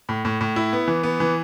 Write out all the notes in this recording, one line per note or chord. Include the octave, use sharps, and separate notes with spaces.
A2
A2
A2
E4
B3
E3
B3
E3